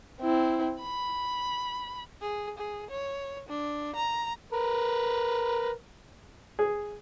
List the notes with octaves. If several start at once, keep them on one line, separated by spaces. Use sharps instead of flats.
C4 E4
B5
G#4
G#4
C#5
D4
A#5
A#4 B4
G#4